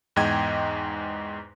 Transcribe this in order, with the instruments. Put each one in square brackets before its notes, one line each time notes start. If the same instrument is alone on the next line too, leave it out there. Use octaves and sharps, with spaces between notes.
[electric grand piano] E2 G#2 D#5 G5 G#6